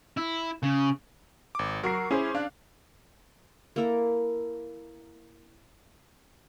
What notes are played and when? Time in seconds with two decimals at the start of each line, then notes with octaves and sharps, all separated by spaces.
0.17 E4
0.63 C#3
1.55 G#1 D6
1.83 F#3 F#4 A#4 C#6 C7
2.11 C#4 E4 G#4 C5
2.35 D4 F5 F#6
3.76 A#3 E4 A4 A#4